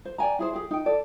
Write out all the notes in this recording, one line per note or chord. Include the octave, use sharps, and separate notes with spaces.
C5
D5 G5 G#5 A#5
E4 G#4 C5
G4 G#4
D#4 G5
A4 D5